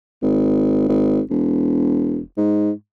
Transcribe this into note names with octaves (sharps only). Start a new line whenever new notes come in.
G#1
G#1
E1
G#2